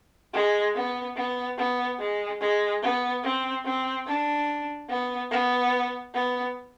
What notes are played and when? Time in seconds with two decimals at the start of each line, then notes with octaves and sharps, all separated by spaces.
0.33 G#3
0.75 B3
1.16 B3
1.58 B3
1.99 G#3
2.40 G#3
2.82 B3
3.23 C4
3.65 C4
4.07 D4
4.89 B3
5.31 B3
6.14 B3